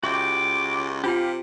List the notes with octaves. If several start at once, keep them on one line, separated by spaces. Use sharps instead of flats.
C#2 F#4 G4 E5 G5 D6
C3 D4 F4 G4 F5 G5